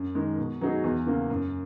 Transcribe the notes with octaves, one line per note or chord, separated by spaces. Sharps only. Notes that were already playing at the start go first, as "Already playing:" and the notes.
Already playing: F#2
D#3 G#3
B2
F#3 B3 D#4 G#4
E2
C#3 E3 A#3
F#2